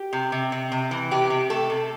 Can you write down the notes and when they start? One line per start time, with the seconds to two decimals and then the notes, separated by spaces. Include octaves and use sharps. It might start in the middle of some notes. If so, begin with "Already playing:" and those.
Already playing: G4
0.13 C3
0.32 C3
0.52 C3
0.72 C3
0.91 E3
1.11 C3 G4
1.30 C3
1.50 A3 A4
1.70 C3